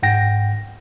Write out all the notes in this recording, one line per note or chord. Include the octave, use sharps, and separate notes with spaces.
G#2 F#5 G5 A#6